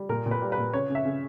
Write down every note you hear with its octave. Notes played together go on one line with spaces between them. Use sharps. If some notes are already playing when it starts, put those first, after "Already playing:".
Already playing: G3
A#2 A#4
A#2
B4
G3
B4
A#2
C#3 C#5
C#3
E5
C#3